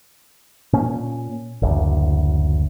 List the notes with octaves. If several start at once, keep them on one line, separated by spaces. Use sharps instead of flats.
A#2 C#4
F#1 D2